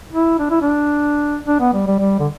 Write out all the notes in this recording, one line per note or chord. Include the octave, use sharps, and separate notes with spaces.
E4
D4
E4
D4
D4
B3
G3
G3
G3
D3